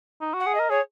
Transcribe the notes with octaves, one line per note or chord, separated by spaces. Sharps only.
D#4
F#4
F#5
G#4
D#5
A#4
G#4 C#5